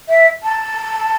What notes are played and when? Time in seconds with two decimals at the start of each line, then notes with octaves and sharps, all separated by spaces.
0.09 E5
0.43 A5